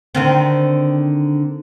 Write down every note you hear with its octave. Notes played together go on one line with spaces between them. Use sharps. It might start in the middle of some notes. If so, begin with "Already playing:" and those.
D3 D#3 C4